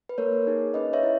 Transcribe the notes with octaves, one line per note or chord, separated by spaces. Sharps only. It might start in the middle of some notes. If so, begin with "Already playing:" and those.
B4
A#3 A#4 C#5
D#4 G#4
C#4 B4 D#5
C#5 E5
E4